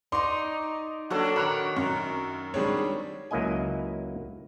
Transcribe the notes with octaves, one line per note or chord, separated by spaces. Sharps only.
D#4 D5 C6 C#6
F#3 A#3 D4 F#4 A4 C#5
D#3 A#4 C#5 B5 F#6 F7
F#2 C#6
D#3 G3 G#3 C4 D4 C#5
C#2 F#3 A#3 E4 D#5 G#5